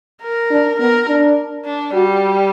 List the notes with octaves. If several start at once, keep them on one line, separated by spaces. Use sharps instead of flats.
A#4
D4
B3 A#4
D4
D4
G3 F#4